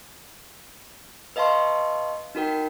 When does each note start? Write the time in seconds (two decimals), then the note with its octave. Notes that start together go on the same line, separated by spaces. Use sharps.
1.36 B4 D#5 F5 A5 C6 C#6
2.35 D#4 F#4 A#4 G5